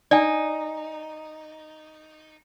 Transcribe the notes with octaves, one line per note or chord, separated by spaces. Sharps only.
D#4 D5 G#5